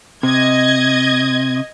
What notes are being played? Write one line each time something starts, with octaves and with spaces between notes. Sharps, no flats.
C3 D#5 G#6